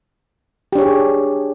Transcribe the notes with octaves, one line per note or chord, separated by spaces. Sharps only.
D4 G4 G#4 C#5